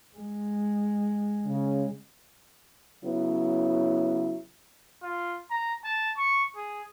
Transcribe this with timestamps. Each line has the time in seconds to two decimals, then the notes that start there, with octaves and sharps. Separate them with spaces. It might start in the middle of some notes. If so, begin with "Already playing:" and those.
0.17 G#3
1.46 C#3
3.03 C#3 F#3 B3 E4
5.03 F4
5.51 A#5
5.84 A5
6.17 C#6
6.56 G#4